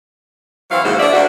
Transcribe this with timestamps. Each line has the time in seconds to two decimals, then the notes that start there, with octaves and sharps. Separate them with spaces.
0.70 E3 F#3 C4 E4 F5
0.84 D#2 G#2 C#3 F#3 C5
0.99 D4 F#4 D5 E5
1.13 D2 C4 D4 F#4 C5